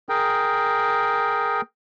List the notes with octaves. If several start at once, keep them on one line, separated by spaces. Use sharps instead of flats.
G#4 A#4 G5